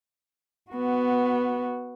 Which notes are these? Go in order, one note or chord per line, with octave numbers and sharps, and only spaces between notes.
B3 F#4